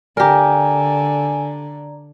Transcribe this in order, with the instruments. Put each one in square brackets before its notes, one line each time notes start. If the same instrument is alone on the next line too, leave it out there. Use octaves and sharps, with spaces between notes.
[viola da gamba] D3 [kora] G4 A#4 [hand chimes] D5 A#5 [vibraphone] G#5